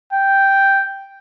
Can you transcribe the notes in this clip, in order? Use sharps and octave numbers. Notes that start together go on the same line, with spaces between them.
G5